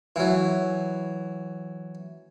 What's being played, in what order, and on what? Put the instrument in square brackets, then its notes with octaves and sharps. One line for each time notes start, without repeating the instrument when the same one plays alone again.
[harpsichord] E3 F#3